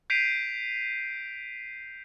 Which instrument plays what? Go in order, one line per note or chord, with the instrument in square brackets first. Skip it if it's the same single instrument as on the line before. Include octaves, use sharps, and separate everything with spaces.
[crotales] G6 B6 C7 D7 D#7 F7